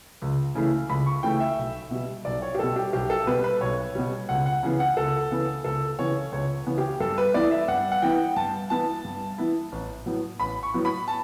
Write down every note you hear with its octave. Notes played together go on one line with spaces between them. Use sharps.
C#2
C#3 E3 A3 E4
C#2 B5
C#6
C#3 E3 A3 E4 G5
E5
B1
B2 G3
B1 D5
C#5
G4
B2 G3 A4
G4
B1 G4
A4
B2 G3 B4
B4
B1 C#5
B2 G3
C#2 F#5
F#5
C#3 E3 B3
F#5
C#2 A4
C#3 E3 B3
C#2 A4
C#3 E3 B3 C#5
C#2 C#5
C#3 E3 B3
G4
G2 A4
B4
E3 B3 E4 D5
E5
G2 F#5
F#5
E3 B3 E4 G5
G2 A5
E3 B3 E4 A5
G2
E3 B3 E4
A1
A2 F#3 B3
A1 B5
C#6
A2 F#3 B3
B5
A5